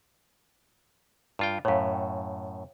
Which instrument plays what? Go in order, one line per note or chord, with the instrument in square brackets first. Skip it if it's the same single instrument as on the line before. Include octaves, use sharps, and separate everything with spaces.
[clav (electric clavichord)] G2 F4 G5
[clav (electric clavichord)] F#2 A2 [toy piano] C#5 F5
[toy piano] G5